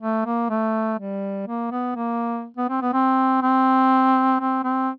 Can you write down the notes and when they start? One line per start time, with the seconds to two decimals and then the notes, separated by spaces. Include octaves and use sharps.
0.01 A3
0.26 A#3
0.49 A3
0.99 G3
1.47 A#3
1.71 B3
1.96 A#3
2.57 B3
2.69 C4
2.82 B3
2.93 C4
3.42 C4
4.40 C4
4.64 C4